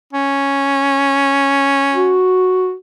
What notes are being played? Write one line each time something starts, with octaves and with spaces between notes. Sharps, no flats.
C#4
F#4